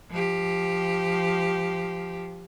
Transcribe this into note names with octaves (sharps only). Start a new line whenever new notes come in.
F3 G4